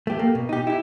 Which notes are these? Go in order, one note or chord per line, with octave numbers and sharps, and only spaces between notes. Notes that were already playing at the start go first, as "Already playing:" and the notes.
A3 G4
A#3
B2
D#4 G4
E4 G4